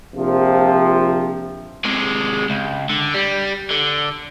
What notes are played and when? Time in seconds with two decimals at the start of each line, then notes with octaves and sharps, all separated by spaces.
0.16 A#1 C3 F3
1.85 C3 G#3
2.50 C#2
2.90 D3
3.14 G3
3.71 D3